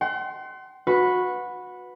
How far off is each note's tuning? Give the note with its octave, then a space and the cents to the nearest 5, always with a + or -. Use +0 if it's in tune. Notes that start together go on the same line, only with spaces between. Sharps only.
F#5 +45 C6 +0
F#4 -20 B4 +0